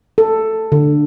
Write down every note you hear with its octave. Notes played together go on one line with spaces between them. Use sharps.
A4
D3